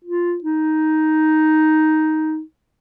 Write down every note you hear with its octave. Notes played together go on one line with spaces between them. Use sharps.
F4
D#4